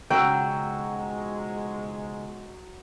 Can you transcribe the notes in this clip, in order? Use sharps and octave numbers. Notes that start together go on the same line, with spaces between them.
B1 C#3 F3 F#3 G#3 G5 E6